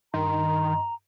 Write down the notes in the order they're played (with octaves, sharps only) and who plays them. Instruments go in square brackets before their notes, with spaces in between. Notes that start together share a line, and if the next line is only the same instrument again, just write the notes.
[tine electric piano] G2 D#5 C6 [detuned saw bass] D#3 [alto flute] A#5